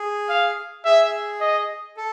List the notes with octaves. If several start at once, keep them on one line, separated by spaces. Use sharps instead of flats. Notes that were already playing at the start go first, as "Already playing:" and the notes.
Already playing: G#4
F5
G#4 E5
D#5
A4